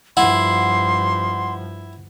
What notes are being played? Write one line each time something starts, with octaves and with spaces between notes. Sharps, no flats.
G2 F3 E4 F#5 C6